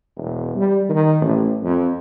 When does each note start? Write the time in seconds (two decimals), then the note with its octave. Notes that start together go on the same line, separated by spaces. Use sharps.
0.17 E1
0.56 G3
0.89 D#3
1.21 A1
1.63 F2